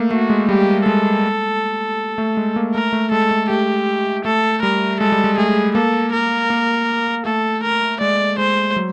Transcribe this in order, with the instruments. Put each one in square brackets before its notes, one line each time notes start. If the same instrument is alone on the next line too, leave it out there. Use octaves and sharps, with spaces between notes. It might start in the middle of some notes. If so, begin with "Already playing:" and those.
Already playing: [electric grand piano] A3 A#3
[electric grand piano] A3 [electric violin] F#4
[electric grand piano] G#3
[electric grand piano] G3 [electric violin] G4
[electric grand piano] G#3 [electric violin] A4
[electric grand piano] A3
G#3
A#3
[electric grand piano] A3 [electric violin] A#4
[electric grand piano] A3
[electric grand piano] G#3 [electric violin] A4
[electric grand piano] A3
[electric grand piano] A3 [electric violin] G4
[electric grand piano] A3 [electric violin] A4
[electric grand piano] G3 [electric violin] A#4
[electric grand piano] G#3 [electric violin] A4
[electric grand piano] G3
G#3
[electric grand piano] A3 [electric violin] G#4
[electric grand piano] A#3 [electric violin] A4
[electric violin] A#4
[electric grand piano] A#3
[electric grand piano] A3 [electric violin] A4
[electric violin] A#4
[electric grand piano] G#3 [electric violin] D5
[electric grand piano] G#3 [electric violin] C5
[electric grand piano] F#3